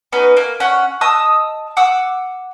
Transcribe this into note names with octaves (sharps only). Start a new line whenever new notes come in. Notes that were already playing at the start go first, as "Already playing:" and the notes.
B3 C#4 D#4 B4
A#3
C#4 F#5
D#5 A5 D#6 E6
F#5 D6 E6